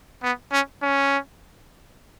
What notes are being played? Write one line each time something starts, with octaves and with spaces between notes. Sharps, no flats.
B3
C#4
C#4